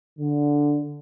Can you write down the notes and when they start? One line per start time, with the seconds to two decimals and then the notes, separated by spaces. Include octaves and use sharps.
0.19 D3